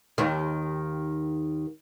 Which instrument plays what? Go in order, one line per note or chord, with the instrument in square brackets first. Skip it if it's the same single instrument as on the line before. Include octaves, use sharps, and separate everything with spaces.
[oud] D#2 D#3